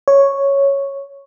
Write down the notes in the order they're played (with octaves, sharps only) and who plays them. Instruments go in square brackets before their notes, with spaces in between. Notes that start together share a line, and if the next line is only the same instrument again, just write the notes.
[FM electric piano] C#5